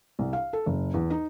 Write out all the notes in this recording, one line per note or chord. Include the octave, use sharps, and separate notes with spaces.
C2
F5
A4
F#1
E2
D#4